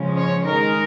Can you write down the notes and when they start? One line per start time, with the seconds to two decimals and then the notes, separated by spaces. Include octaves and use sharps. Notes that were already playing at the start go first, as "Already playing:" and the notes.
Already playing: C#3 F3 G#3 C#4
0.16 C#5
0.43 D#3 G#3 D#4 A#4